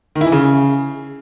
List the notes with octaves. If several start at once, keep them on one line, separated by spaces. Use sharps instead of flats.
D#3
E4
E3
C#3